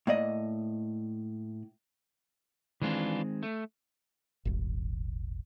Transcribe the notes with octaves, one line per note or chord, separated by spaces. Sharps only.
A2 A#3 D5 D#5
D#3 E3 G#3 C4 D4 F4
A3
D#1 G#1